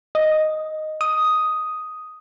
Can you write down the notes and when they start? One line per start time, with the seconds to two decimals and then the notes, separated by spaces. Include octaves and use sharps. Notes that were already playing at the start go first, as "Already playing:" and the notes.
0.15 D#5
1.01 D#6